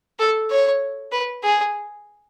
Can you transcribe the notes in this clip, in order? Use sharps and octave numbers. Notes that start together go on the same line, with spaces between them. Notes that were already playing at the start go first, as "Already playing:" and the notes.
A4
C#5
B4
G#4